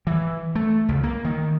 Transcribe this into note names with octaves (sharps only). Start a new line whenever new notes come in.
E3
A3
C#2
A#3
D#3